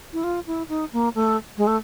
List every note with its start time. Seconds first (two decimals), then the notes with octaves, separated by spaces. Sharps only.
0.13 E4
0.24 F4
0.47 E4
0.69 D#4
0.93 A#3
1.15 A3
1.57 G#3
1.67 A3